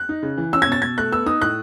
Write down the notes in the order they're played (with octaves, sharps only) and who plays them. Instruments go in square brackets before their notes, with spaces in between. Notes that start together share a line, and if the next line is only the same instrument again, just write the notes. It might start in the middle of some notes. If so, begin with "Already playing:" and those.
Already playing: [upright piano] F#6
D#4
C#3
E3
C#4 E6
G#6
B2 A6
B2 G#6
A3 F#6
B3 E6
D#4 D#6
A2 F#6